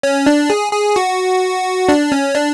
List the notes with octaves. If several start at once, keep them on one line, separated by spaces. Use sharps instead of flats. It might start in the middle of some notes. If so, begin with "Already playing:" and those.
C#4
D4
G#4
G#4
F#4
D4
C#4
D4